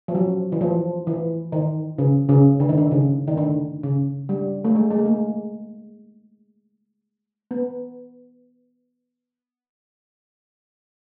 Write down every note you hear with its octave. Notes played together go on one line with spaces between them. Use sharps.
F3
F#3
E3
F3
E3
D#3
C#3
C#3
D3
D#3
D3
C#3
D#3
D3
C#3
G3
A3
G#3
G#3
A3
A#3
B3